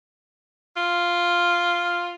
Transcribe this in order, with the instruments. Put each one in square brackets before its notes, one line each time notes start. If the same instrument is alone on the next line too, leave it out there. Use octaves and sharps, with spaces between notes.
[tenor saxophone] F4